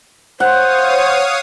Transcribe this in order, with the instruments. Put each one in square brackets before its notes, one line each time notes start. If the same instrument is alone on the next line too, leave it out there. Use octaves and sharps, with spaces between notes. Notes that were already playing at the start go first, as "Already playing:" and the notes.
[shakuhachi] C5 [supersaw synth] C#5 F5 D#6 [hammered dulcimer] F#5